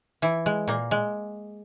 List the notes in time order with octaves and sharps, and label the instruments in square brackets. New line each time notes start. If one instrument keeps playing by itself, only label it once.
[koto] E3 E4
G#3
A#2 A#3
G#3